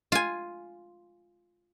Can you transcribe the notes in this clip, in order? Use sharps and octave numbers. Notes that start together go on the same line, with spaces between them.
F4 G#5